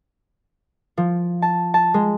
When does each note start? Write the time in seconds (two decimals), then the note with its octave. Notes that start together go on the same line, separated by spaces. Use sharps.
0.97 F3
1.42 A5
1.74 A5
1.94 G#3